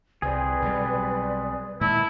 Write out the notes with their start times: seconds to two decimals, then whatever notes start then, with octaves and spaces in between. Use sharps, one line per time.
0.22 C2 C4 G#4 B4 D5
0.62 B1 F#3 G3
1.81 A#2 D#3 G#3 E4 A5